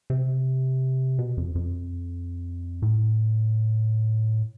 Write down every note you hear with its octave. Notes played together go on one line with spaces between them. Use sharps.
C3
B2
F2
F2
A2